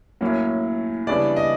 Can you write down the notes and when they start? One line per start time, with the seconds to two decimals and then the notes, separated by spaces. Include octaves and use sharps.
0.21 A2 F#3 A#3 C#4
1.07 C#3 E3 G3 B3 D4 D5
1.36 D#5